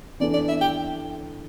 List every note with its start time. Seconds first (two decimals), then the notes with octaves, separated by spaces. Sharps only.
0.20 E3 B3 D4 A4 D5
0.34 D5
0.48 E5
0.61 G5